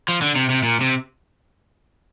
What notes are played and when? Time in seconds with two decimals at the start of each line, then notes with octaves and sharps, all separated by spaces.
0.08 F3
0.22 D3
0.36 C3
0.50 C3
0.63 A#2
0.81 C3